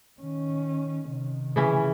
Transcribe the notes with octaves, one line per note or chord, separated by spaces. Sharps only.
D#3 C#4
C3 D#3
C#3 E3 C#4